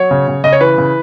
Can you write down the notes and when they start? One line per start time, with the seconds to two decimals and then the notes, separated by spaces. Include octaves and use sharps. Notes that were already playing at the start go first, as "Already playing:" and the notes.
Already playing: F#3 C#5
0.11 C#3
0.28 C#3
0.44 C#3 D#5
0.52 C#5
0.61 E3 B4
0.78 C#3